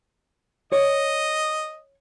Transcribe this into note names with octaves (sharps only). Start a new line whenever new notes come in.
C#5 D#5